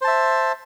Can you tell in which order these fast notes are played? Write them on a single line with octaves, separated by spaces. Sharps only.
C5 A5 E5